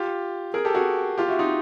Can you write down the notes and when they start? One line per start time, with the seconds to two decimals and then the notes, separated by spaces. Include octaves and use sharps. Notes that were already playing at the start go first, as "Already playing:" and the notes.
Already playing: F4 G4
0.54 G#4 A#4
0.65 G4 A4
0.75 F#4 G#4
1.18 F4 G4
1.28 E4 F#4
1.39 D#4 F4